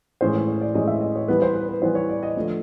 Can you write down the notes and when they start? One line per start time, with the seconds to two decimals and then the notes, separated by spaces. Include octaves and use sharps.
0.21 A2 E3 G#3 C#4 C5
0.35 C#5
0.48 C#5
0.61 D5
0.74 A2 E3 G#3 C#4 D#5
0.87 E5
1.01 D#5
1.16 C#5
1.28 E3 G3 B3 B4
1.42 C5
1.56 B4
1.69 B4
1.82 E3 G3 B3 C5
1.95 C#5
2.09 D5
2.23 D#5
2.37 D3 F3 A3